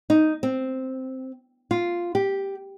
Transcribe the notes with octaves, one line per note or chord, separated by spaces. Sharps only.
D#4
C4
F4
G4